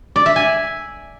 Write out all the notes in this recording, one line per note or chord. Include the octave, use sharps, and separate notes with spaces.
D5
E5
G#5